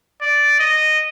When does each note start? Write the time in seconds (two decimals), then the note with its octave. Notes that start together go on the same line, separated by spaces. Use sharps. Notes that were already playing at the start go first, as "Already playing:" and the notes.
0.21 D5
0.59 D#5